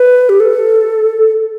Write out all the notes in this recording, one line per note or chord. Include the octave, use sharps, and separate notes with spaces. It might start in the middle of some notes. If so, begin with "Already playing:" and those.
Already playing: B4
G4
A4